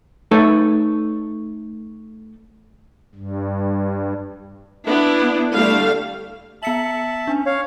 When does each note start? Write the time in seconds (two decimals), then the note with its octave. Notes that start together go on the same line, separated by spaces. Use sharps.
0.31 A3 D#4 A4 B4 C#5
3.15 G2
4.86 B3 D4 E4
5.54 D3 G3 A3 F5
6.63 B3 E5 A5 C#7 F#7
7.27 C#4 D4
7.46 C#5 F5